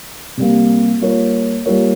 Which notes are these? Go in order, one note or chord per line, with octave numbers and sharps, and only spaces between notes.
C3 G3 A#3
G3 A#3 F4 A#4 C#5
G3 A#3 F4 A#4 C#5